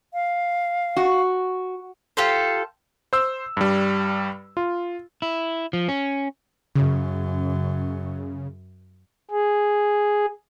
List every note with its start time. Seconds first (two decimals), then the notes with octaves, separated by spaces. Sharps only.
0.14 F5
0.97 F#4
2.17 F4 G4 A4 C5
3.13 C5 E6
3.57 G2 G3
4.57 F4
5.22 E4
5.73 F3
5.89 C#4
6.76 F#2 C#3
9.31 G#4